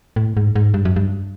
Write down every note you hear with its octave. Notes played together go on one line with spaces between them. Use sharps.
A2
G#2
G#2
G2
F#2
G2